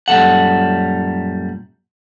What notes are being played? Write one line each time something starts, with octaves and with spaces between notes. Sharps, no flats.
F#2 A#2 G3 A4 F#5